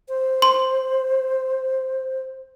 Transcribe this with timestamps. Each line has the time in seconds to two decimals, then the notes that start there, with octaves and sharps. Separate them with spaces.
0.08 C5
0.42 C6